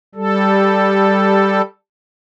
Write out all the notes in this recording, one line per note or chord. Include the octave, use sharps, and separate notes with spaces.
G3 A4